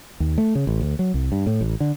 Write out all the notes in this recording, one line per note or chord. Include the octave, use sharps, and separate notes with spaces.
D#2
A3
C#3
A1
D2
F#3
C2
G2
A2
A1
D3